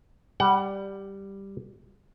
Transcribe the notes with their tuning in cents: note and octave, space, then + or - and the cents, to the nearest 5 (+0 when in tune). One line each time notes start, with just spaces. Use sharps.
G3 +0 F#5 +30